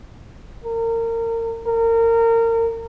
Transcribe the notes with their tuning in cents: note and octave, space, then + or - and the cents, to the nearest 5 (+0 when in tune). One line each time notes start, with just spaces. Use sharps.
A#4 -30
A#4 -25